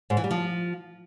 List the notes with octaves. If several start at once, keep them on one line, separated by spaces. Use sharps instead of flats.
G#2
E3
G3
F3